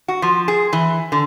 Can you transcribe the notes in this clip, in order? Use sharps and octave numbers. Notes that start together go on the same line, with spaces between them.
F#4
F3
G#4
E3
D3